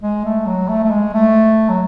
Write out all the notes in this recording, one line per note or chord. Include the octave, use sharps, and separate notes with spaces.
G#3
A3
F#3
A3
A3
G#3
A3
F#3